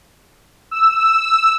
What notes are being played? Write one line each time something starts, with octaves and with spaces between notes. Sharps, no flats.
E6